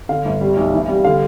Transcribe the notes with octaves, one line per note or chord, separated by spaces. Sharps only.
D3 F5
G1
G3
B1
E3
G3
D3 F5